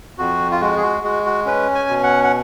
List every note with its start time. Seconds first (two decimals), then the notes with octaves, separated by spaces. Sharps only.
0.18 F2 F#4
0.52 F4
0.61 G#3 F#4
0.77 G#4
0.83 F#4
1.03 G#3 F#4
1.26 F#4
1.46 C#4 B4
1.75 G#5
1.89 B2
2.03 F#5
2.24 F#5